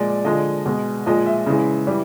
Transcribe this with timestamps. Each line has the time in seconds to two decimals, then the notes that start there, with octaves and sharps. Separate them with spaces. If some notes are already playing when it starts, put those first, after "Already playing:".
Already playing: A#2 F3 G#3 D5
0.25 D3 F3 G#3 D#5
0.66 B2 G#3
1.06 A#2 F3 G#3 D#5
1.26 E5
1.46 C#3 E3 G#3
1.87 E3 G3